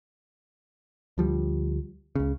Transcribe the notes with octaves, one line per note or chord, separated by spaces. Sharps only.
D2 F3 G3
C#2 C#3